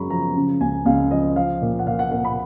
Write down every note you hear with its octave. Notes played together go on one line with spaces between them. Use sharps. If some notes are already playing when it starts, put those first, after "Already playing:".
Already playing: F#2 C#3 G#3 A#5 B5 C#6
F3 A#5
C#3
C#2 G#5
C#2 F5
F3 D#5
F3 F5
A#2
F#5
A#2 F5
F#5
A#3 F#5
B5